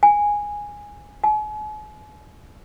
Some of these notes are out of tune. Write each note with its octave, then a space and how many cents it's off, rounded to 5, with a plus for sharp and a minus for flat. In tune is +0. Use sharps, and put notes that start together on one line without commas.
G#5 -10
G#5 +40